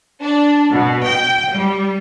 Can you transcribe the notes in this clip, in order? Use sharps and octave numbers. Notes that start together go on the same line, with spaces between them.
D4
B2
G5
G3